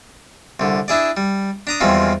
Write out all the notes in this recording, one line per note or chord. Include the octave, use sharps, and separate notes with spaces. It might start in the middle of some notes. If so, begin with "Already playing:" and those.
C2 D3
D4 E4 G#4 D5
G3
D4 A#5 D#6
E2 D#3 F3 G3 G#3 C4